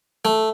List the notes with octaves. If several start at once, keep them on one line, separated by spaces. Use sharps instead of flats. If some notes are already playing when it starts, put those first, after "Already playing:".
A3